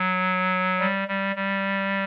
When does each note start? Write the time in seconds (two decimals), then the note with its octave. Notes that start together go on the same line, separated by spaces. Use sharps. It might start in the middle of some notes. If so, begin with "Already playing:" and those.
Already playing: F#3
0.80 G3
1.08 G3
1.36 G3